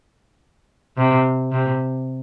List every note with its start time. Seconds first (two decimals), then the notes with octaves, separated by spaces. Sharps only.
0.98 C3
1.52 C3